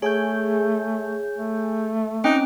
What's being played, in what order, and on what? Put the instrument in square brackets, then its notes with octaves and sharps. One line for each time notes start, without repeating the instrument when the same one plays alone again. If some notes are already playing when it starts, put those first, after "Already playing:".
[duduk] A3 [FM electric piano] G#4 G#5 G6 [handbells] C#5
[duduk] A3
[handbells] C4 C#4 G5 [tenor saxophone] D#4